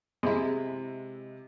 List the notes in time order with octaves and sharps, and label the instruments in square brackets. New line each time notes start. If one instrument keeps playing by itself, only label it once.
[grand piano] C3 [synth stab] G#3 E4